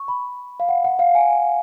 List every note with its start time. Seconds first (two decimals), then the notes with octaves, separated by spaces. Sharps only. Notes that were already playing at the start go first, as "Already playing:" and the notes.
Already playing: C#6
0.08 B5
0.60 F5
0.69 F#5
0.84 F#5
0.99 F5
1.15 G#5